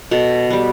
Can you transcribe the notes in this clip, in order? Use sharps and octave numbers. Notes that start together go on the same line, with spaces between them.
B2 A4
G3 B3